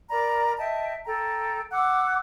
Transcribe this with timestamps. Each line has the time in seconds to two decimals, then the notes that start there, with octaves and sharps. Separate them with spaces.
0.10 A#4 D5 A#5 B5
0.58 D#5 E5 G5 A5
1.06 A4 G5 A#5
1.72 F#5 D6 E6 F#6